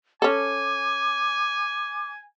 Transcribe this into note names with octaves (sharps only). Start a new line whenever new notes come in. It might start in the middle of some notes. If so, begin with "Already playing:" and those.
C#4 A4 G#5 D6